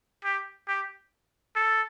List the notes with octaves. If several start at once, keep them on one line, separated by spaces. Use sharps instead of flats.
G4
G4
A4